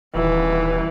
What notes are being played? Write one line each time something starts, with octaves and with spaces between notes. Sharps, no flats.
D#1 E3